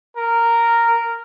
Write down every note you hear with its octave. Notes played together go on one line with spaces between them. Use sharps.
A#4